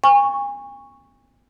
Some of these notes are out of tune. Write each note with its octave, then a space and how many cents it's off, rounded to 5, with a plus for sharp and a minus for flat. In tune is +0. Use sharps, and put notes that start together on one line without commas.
G#5 -40 C#6 +0